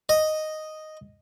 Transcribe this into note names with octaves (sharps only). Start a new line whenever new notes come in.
D#5